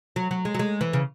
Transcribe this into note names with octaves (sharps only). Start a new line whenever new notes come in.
F#3
F#3
G#3
F#3
G#3
E3
C#3